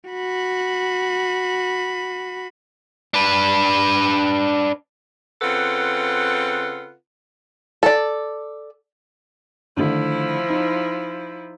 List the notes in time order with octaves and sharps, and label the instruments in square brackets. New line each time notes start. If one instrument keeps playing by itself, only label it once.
[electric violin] F#4 B5
[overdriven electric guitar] D4 B4
[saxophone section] C#3 C4 F4 A4 B4 F#5
[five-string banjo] A4 D5
[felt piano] D3 D#3 A3 [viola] F3 E4
[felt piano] D#4